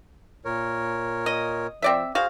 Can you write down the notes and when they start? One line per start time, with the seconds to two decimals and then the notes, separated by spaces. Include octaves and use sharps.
0.45 A#2 A#4 C#5
1.26 D#5
1.82 F3 C4 D5 E5
2.15 F#4 G#4 C5 F5